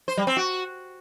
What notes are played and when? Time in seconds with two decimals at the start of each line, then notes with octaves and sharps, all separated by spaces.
0.08 C5
0.17 G3
0.27 C4
0.37 F#4